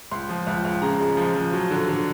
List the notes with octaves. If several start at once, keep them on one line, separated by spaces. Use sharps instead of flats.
C#2 C6
F3
C#2
C#2
C#3 A#5
G#3
F3
F3
F#3
D3
D3